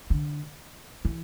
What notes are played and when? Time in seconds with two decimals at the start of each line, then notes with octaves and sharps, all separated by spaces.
0.10 D3
1.05 E3